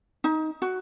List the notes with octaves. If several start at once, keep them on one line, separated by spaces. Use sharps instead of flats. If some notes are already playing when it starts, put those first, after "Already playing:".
D#4
F#4